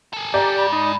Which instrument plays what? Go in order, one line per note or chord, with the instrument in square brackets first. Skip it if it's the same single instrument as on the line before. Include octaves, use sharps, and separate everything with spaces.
[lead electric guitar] G#4 A4
[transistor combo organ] G4 [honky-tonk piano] D5 [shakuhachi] A#5
[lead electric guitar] G#2 [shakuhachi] B5
[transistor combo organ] D#4